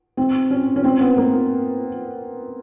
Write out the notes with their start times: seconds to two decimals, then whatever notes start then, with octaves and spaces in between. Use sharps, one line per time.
0.17 C4
0.50 C#4
0.76 C#4
0.84 C4
1.00 B3
1.17 A#3